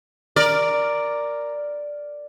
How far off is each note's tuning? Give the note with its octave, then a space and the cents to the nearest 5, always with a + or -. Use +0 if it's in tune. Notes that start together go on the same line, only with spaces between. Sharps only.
A#4 +0 D5 +0